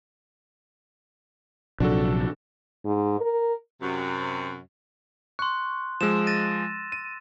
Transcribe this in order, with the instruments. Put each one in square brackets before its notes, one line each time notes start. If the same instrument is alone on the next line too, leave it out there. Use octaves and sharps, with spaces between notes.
[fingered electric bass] A#1 C3 F#3 [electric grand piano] D4 F#4 A4
[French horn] G#2
A#4
[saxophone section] F#2 C3
[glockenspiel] C6 F#6 [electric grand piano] C#6
[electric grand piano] F3 G#3 [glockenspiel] E6 E7
[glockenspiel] A6 A#6 D#7
[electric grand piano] D#7